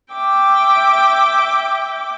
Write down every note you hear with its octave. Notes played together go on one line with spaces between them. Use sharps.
E5 G5 D6